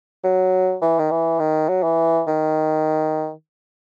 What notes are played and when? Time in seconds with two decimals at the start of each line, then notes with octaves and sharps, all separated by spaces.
0.24 F#3
0.82 E3
0.99 D#3
1.11 E3
1.39 D#3
1.69 F#3
1.83 E3
2.27 D#3